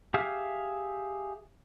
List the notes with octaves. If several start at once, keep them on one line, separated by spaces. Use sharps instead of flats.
G4 G#4 E5 F5